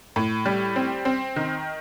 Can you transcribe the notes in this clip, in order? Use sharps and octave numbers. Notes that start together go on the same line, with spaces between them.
A2
G3
C4
C4
D#3